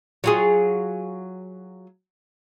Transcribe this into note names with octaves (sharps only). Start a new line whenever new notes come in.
F#3 F4 G#4